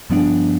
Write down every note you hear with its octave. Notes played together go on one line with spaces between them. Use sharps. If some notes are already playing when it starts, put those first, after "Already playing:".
G2 F3 B3 D4